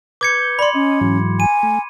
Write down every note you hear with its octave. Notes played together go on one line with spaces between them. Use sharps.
B4 D6 G6 G#6 C#7
D5 B5 C6
C#4 D#5
G#2 E3 F#3
G#5 D#7
A3